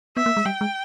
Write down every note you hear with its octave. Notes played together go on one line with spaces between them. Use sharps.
B3 E5
A#3
G#3
G3 G5
G#3